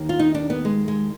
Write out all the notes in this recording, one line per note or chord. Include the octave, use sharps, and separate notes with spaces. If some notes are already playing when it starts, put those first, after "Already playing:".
Already playing: D#2 D#3
F4
D#4
D4
B3
G#3
G#3